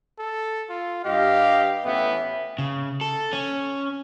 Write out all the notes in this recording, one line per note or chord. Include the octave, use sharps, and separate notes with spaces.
A4
F4
G2 G4 D#5 F5
A1 E3 B3 E5 G5
C#3
A4
C#4